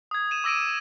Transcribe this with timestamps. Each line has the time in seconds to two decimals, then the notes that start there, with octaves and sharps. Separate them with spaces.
0.11 D#6 G#6
0.31 D#7 E7
0.44 D6 E6 A#6 D7 D#7